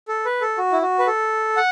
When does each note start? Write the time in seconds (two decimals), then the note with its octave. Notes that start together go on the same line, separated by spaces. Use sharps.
0.08 A4
0.25 B4
0.41 A4
0.58 F#4
0.72 E4
0.82 F#4
0.99 B4
1.07 A4
1.57 F#5